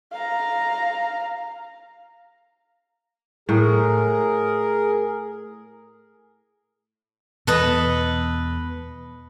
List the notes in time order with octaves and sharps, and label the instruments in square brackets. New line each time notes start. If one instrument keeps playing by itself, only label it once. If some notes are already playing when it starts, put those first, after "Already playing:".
[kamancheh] F5 A#5
[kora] A2 [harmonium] G#4 A#4
[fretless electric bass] E2 B2 [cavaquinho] A4 B4 D#5